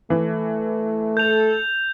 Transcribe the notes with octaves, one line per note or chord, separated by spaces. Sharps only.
E3 A3
A4 G6 F7